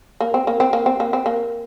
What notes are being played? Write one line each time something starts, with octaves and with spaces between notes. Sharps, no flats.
A#3
C4
A#3
C4
A#3
C4
A#3
C4
A#3